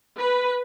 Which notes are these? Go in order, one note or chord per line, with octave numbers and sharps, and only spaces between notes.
B4